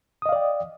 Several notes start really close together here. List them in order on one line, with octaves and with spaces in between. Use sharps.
D#6 D#5 F5 D5 G5